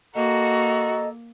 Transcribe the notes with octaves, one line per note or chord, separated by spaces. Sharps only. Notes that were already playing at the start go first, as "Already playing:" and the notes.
A#3 F#4 A4 D#5 A#5